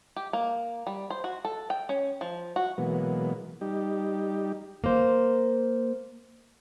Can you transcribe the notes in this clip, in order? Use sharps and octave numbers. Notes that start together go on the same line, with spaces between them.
G4
A#3
G3
C5
F#4
A4
G5
C#4
F3
F#4
B2 E3 F#3 G#3 A#3 B3
G3 D#4 G4
A#3 C5